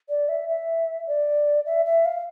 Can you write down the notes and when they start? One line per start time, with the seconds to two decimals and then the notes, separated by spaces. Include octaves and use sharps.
0.09 D5
0.29 E5
0.49 E5
1.07 D5
1.66 E5
1.86 E5
2.05 F5